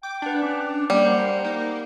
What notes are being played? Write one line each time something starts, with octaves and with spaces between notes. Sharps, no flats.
G5 D6
D4 B4 F#5 A5
C#4 D6
G3 A#3
C5 F#5 C#7
A#3 D#4